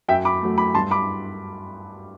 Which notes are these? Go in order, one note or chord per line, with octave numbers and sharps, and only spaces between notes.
F#2 E5 G5
B5 D6
F#3 A3
B5 D6
G2 A5 C6
B5 D6